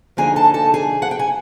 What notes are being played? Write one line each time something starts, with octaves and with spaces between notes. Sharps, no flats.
D3 F3 A#3 D#4 G#4 G#5
A4 A5
A4 A5
G#4 G#5
F#5
G5
G#5